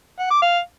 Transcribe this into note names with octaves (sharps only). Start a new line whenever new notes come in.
F#5
D6
F5